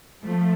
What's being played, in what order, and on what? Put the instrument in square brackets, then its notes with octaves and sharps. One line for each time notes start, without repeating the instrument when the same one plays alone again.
[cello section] F3 A3